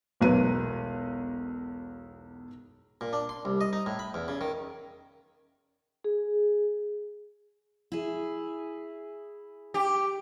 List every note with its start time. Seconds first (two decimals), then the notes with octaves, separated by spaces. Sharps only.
0.20 E1 B1 F#3 B4 D#7
3.01 A#2
3.13 D4
3.29 C6
3.45 C2
3.61 D#5
3.73 D#4
3.86 A2
3.99 B5
4.14 E2
4.28 C#3
4.41 D#3
6.04 G#4
7.92 E4 G#4
9.74 G4